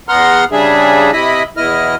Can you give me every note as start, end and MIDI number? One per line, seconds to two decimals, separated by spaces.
0.09 0.45 40
0.09 0.45 59
0.09 0.45 78
0.09 0.45 82
0.09 0.45 84
0.09 0.45 89
0.52 1.11 49
0.52 1.11 55
0.52 1.11 62
0.52 1.11 68
0.52 1.11 76
1.13 1.43 48
1.13 1.43 64
1.13 1.43 75
1.13 1.43 83
1.57 1.96 40
1.57 1.96 47
1.57 1.96 64
1.57 1.96 75
1.57 1.96 89